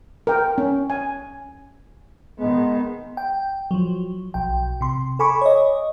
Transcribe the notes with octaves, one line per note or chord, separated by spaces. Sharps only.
A#4 G5
C#4
G#5
D#3 G#3 B3
G5
F3 F#3
B1 G5
C3 C6
A4 G#5 B5 C#6 D6
C#5 D#5